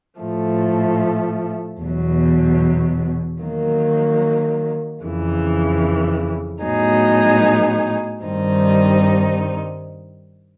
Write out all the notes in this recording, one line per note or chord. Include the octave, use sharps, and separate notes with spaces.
A2 F3 A3
E2 B2 F#3
D#3 F#3 A#3
F2 C#3 E3
A2 F#3 B3 D#4 G#4
G2 D#3 G3 C4 D#4